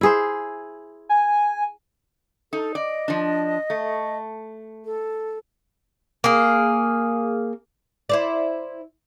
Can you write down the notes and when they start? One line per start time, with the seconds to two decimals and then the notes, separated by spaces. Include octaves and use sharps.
0.01 E4 G#4 C5
1.09 G#5
2.53 D#4 A4
2.75 D5 D#5
3.08 F3 D4
3.70 A3
4.85 A4
6.24 A#3 G#4
8.09 E4 C5 D5